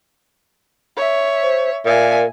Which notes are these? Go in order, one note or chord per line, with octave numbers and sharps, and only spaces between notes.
C#5 E5
C5
A#2 A#4 E5 G#5